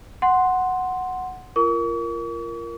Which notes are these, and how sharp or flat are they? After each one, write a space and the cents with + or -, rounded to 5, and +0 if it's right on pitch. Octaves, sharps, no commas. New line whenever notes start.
F#5 +0 C6 +0
F4 -30 A#4 +0 C#6 +45